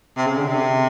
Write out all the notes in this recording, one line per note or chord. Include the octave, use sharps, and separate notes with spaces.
C3
C#3
D3
C3